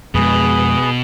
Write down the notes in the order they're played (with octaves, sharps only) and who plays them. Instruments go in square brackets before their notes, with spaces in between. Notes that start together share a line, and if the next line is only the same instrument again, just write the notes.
[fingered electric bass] F2 G#3 [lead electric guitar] B2 [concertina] G#4 B4